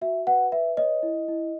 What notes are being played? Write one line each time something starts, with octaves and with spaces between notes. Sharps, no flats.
F#4 E5
B4 F#5
B4 E5
C#5 D#5
E4
E4